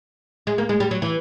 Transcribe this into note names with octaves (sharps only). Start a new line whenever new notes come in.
G#3
A#3
G#3
G3
F#3
E3